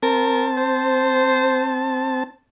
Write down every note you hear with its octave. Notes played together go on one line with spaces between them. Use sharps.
C4 A#4 A5
C5